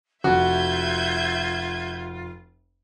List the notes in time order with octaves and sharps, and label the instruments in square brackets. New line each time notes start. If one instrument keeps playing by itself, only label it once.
[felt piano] F1 [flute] F4 [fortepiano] F#4 [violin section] E5 G6 G#6